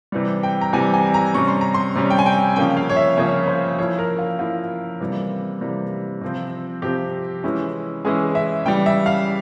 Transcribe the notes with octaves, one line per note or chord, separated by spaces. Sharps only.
C3 E3 G3
G5
A#5
C3 E3 G3 G#5
G#5
A#5
C3 G3 C#4 C#6
C6
A#5
C6
C3 G3 C#4
G5
G#5
G5
C#3 F3 A#3 C#4 G5
F5
C#5
E5
C#3 F3 A#3 C#4 C#5
C5
F3 A#3 E4 C#5
A#4
F4
F3 A#3 E4 F4
C3 E3 G3 A#3
C3 E3 G3 A#3
C3 F3 C4
C3 F3 C4 G4
E3 G#3 C#4 E4
E3 G#3 C#4 E4 G#4
E5
C#3 E3 G3 G5
E5
F5